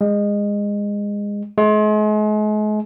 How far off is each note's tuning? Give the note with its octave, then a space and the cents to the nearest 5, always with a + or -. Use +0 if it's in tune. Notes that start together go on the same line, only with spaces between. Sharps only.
G#3 -20
G#3 +40